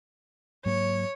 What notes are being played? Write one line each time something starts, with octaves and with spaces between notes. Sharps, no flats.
G#2 F#3 A#3 C#5